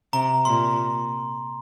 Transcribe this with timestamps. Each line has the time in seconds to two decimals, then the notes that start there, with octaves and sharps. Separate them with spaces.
0.13 C3 A#5
0.45 A#2 C6